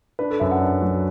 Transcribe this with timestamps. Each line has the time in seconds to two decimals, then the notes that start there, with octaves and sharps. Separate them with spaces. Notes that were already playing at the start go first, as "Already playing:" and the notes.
0.19 D4 B4
0.30 A4
0.40 F#2 E5
0.51 F#5
0.61 D4
0.82 F#3